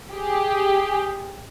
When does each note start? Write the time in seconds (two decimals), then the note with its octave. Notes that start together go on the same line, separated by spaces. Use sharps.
0.11 G4 G#4